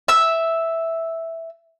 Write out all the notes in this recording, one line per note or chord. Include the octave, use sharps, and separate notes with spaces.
E5 E6